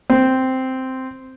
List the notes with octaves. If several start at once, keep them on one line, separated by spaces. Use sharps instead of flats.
C4